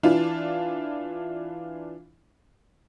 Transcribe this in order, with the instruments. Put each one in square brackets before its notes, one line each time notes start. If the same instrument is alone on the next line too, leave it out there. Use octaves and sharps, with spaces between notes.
[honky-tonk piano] E3 D4 F4